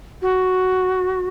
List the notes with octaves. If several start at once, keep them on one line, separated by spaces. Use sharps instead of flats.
F#4